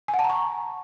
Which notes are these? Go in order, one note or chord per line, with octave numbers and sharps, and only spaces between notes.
G#5
F#5
A5
A#5
C#6